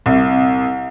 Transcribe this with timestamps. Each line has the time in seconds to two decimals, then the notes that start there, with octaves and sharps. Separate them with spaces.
0.06 C2